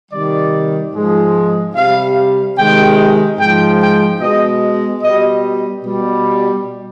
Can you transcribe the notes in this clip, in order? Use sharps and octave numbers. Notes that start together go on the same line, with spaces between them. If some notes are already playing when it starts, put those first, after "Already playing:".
C3 D#3 G3 D5
G#2 F3 G#3
C3 G3 F5
C3 D#3 G#3 G5
G#2 F3 G#3 G5
G5
B2 G#3 D#5
B2 G3 D#5
B2 G3